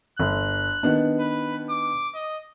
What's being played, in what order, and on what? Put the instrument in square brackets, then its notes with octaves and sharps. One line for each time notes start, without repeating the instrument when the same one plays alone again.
[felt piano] G1 [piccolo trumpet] F#6
[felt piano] D#3 B3 D4
[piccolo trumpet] B4
D6
D#5